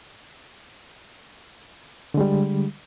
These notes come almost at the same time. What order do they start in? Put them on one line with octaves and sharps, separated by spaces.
D3 G#3 G3